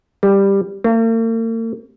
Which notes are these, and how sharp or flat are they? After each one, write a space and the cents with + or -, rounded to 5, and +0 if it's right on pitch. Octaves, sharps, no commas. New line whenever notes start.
G3 +10
A#3 -45